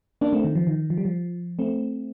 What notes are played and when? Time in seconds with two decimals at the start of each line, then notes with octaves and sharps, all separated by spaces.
0.21 A#3 D4
0.33 A3 C4
0.44 D#3
0.55 F3
0.67 D#3
0.90 F3
0.98 G3
1.05 F3
1.59 A3 C4